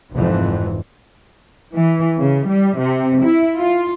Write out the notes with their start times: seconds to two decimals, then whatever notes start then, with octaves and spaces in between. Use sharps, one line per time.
0.14 F1 F2 G#2 E3
1.74 E3
2.18 C#3
2.49 G3
2.79 C3
3.24 E4
3.58 F4